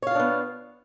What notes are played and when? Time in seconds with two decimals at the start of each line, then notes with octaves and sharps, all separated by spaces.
0.02 C#5
0.07 F5
0.11 F4
0.15 D4
0.20 B3